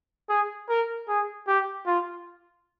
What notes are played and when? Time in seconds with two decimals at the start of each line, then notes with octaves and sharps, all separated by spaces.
0.29 G#4
0.69 A#4
1.08 G#4
1.48 G4
1.86 F4